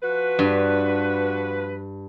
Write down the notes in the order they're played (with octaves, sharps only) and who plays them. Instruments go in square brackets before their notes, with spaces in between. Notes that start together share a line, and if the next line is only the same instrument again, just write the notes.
[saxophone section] F3 F#4 B4
[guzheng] G2